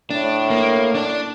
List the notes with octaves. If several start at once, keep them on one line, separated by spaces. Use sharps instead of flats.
A2 D4
A#3
D4 D5